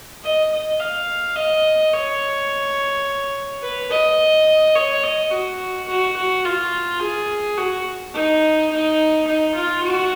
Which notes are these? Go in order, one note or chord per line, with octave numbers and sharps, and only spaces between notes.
D#5
D#5
F5
D#5
C#5
B4
D#5
C#5
D#5
F#4
F#4
F#4
F4
G#4
F#4
D#4
D#4
D#4
F4
F#4